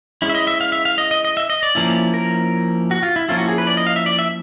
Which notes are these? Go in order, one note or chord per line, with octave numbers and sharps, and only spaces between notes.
G#3 C#4 E4
E5
D#5
E5
F5
E5
F5
D#5
D#5
D#5
E5
D#5
D5
F3 A#3 C#4 E4
A#4
F#4
F4
E4
F3 A#3 C#4 E4 F4
F#4
G#4
B4
D5
D#5
F5
E5
D5
E5